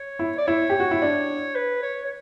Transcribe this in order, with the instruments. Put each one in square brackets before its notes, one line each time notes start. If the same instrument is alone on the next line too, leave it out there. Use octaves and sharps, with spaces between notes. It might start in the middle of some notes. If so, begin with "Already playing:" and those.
Already playing: [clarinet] C#5
[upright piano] E4
[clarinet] D5
[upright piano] E4 [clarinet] C#5
[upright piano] G4
F#4
E4
D4
[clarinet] B4
C#5
C#5